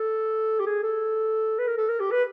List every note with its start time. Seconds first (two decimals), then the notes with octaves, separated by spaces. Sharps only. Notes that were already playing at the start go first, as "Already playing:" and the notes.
Already playing: A4
0.60 G4
0.66 G#4
0.83 A4
1.59 B4
1.67 A#4
1.77 A4
1.89 A#4
2.00 G4
2.11 B4